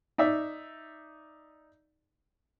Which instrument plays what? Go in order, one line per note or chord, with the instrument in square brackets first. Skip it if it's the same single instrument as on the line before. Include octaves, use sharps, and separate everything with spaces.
[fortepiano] D#4 D5 E5